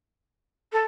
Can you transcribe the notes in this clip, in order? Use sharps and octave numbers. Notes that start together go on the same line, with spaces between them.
A4